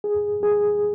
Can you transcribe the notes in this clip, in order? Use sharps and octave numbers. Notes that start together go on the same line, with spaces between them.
G#4
G#4